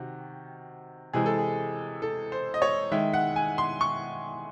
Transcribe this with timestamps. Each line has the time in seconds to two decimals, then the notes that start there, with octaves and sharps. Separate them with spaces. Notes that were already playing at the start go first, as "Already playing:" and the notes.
Already playing: C3 D#3 F#4
1.13 C3 E3 G#3 G#4
1.26 A4
1.39 G#4
2.02 A4
2.32 C5
2.54 D#5
2.62 C#5
2.91 D#3 G#3 E5
3.14 F#5
3.36 G#5
3.58 C6
3.81 C#6